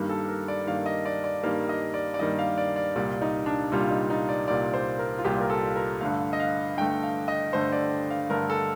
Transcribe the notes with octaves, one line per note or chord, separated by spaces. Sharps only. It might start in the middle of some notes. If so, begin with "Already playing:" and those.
Already playing: G2 D#3 G3 A#3
A4
A#4
D5
G2 D#3 G3 A#3 F5
D#5
D5
D5
G2 D#3 G3 A#3 F5
D#5
D5
D5
G2 D#3 G3 A#3 D#5
F5
D5
D5
C2 A#2 G3 D5
D#4
D4
C2 A#2 G3 F4
D#4
D#4
D5
C2 A#2 G3 D5
C5
A#4
F4
C2 A#2 G3 G4
A#4
A4
A#4
G2 D3 A3 F5
D#5
F5
G2 D3 A3 G5
F5
D#5
G2 D3 A3 C5
D5
F5
G2 D3 A3 A#4
A4